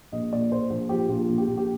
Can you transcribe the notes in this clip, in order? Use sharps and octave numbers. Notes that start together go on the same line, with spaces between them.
A#1 D#5
A#2 D5
A#2 C5
A#1
F3 G4
A#1 F4
A#1
G4
A#1
G4